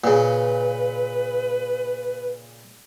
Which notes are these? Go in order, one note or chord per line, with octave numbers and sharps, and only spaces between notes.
A#2 C#3 B4